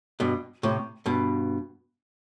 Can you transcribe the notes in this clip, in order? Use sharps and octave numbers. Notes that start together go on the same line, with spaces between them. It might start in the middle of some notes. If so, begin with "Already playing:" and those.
G2 B2
A2 C3
G2 B2